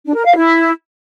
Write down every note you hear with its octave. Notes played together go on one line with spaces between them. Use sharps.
D4
A#4
F5
E4